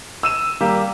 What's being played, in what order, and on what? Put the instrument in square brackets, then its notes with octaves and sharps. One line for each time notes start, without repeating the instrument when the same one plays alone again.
[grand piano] E6 D#7 E7
G3 A#3 G4